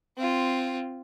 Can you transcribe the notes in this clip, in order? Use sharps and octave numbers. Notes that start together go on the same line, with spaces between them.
C4 F4